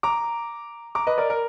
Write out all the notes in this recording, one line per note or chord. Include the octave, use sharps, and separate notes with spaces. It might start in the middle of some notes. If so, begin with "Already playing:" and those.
A#5 D6
A#5 D6
B4 D#5
A#4 D5
A#4